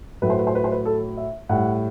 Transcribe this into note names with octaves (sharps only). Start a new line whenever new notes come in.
A2 F#3 A3 B4
C5
B4
C5
B4
C5
B4
A4
E5
A2 G3 F#5